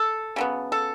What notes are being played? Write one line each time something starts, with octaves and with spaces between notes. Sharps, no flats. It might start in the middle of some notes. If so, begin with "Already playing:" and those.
Already playing: A4
C#3 F#3 B3
A4